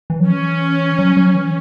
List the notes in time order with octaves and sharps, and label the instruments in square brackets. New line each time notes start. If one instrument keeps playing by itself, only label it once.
[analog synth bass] E3
F#3
[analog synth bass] E3 [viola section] C#4
[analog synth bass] F#3
F#3
E3